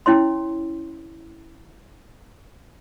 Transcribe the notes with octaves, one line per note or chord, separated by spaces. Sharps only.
C#4 E4 C#5 C6